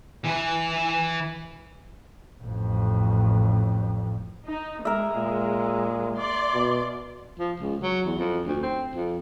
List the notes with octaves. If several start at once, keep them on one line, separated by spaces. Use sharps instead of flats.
E3 B4
A1 F2
D#4
G#3 A#4 E5
A#2
D5 C6
B2
F3
C#2
F#3
E2
F2
D2
C4
F2